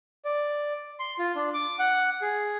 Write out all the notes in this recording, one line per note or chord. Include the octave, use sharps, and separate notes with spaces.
D5
C6
F4
D4
D6
F#5
G#4